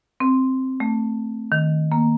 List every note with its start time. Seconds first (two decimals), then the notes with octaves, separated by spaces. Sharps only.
0.20 C4
0.80 A3
1.52 D#3
1.92 A#3